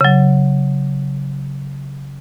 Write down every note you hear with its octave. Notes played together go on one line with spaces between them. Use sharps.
C#3 F#3